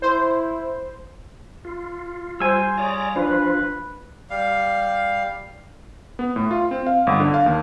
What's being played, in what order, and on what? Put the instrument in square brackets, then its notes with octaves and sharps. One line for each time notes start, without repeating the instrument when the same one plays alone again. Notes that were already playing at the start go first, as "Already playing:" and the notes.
[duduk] E4 [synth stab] C5
[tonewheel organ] F4
[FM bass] G3 [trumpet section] C5 [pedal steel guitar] G#5 E6
[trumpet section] F4 G#4 C#5 [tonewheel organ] D5 A#5
[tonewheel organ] F3 F4 [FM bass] D4 [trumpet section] B4
[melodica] G3 F5
[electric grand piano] B3
A2
F4
C4
F5
G1
D3
F5
D#2